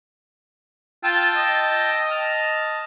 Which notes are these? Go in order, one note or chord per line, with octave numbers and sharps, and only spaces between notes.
F4 G5 A5 E6
D#5
A5 F6